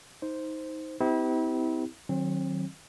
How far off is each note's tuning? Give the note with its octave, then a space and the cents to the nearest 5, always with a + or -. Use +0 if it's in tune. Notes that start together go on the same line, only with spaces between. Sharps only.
D#4 +20 C5 +0
C4 -40 E4 -35 G4 +0
D#3 -20 F#3 +0 C4 +35